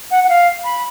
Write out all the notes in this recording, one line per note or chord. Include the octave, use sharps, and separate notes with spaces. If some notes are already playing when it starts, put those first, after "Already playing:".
F#5
F#5
F5
B5